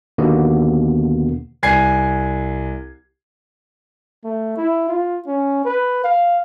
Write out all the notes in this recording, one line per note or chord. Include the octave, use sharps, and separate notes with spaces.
D#2 B2 D3 A#3 B3
C2 G#5 G#6 C7
A3
E4
F4
C#4
B4
F5